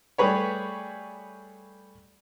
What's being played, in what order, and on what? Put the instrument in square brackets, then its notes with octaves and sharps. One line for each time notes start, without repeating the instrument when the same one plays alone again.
[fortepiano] G3 A3 G#4 B4 C#5